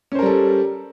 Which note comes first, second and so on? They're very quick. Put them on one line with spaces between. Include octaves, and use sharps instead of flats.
C#4 C5 A#4 G3 A4